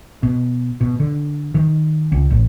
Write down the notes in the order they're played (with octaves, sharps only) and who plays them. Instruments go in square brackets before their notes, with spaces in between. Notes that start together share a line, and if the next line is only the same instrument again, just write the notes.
[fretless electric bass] B2
B2
D3
D#3
C#2
A1